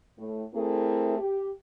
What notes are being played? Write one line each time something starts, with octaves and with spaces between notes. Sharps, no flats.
A2
A3 C4 E4 G#4 A#4
G4